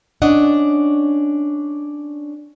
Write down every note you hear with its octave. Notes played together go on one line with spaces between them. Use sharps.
C#4 D4 D#5 F#5